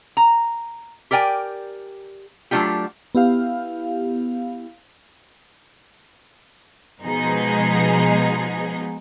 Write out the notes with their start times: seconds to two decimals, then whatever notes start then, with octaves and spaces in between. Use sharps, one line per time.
0.17 A#5
1.11 G4 A#4 D5 G5 G#5
2.51 F#3 A3 D4 F4 G4
3.15 B3 E4 G4 F5
7.02 B2 F3 G#3 D#4 G#4